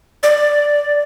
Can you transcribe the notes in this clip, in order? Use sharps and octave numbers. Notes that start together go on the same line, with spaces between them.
D5